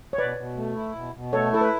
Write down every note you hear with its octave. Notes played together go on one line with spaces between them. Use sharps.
C#5
B2 B4 D5
B2
A3
E4
B2
B2
A3 A4 C#5
E4 A4
B4